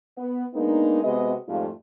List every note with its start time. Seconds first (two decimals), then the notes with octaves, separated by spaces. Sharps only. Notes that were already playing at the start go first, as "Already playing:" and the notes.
0.18 B3
0.55 G#3 A#3 B3 D4 D#4
1.04 C3 G#3 B3 F#4 B4 D#5
1.48 F2 G#2 G3 A3 F4